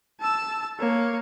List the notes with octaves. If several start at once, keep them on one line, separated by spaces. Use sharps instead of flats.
A5 E6
A#3 C#5